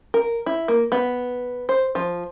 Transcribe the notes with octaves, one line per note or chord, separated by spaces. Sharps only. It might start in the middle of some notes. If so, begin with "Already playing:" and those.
A#4
E4
A#3
B3
C5
F3